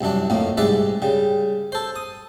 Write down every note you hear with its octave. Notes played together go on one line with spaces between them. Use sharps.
C2 F#2 E3 D4
F2 A2 A#3
C2 G#2 G#3 B4 D5 E5
C#3 G3
A4 C5
D#6